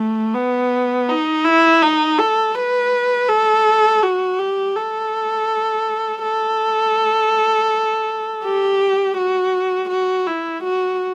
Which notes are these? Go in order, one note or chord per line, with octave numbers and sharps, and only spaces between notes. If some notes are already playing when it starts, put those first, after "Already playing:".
Already playing: A3
B3
D#4
E4
D#4
A4
B4
A4
F#4
G4
A4
A4
G4
F#4
F#4
E4
F#4